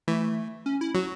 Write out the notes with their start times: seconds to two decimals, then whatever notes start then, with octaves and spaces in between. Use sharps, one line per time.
0.08 E3 A3
0.66 C#4
0.81 E4
0.95 F#3 F#4